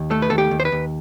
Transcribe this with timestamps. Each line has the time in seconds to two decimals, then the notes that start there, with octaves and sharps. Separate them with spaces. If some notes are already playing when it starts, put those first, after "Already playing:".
Already playing: D#2
0.11 A3 A4
0.22 B4
0.30 D#2 A4
0.38 G4
0.51 D#2
0.60 C5
0.65 B4
0.72 D#2